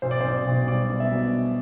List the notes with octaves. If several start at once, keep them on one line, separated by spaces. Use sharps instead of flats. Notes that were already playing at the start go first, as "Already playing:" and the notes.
B1 C5
D5
B1 C5
B1
G3 D5
B2
E5
B2